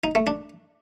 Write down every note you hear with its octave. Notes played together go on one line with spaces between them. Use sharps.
D#4
A3
D4